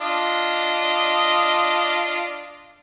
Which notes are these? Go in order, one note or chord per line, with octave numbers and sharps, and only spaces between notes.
D4 F4 D#5